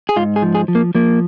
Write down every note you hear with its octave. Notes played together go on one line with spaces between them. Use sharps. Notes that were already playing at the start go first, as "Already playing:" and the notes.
G#4
G#2 F4
G#4
F3
G#4
F3
A#3
F3 A#3